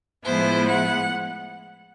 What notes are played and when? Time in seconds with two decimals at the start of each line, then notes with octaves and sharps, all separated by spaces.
0.24 A2 F3 G#3 B3 E4 C5
0.69 F#5